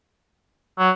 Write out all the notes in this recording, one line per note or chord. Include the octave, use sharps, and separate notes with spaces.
F#3